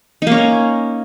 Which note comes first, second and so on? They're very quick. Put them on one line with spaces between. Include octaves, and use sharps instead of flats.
D#4 A#3 C#4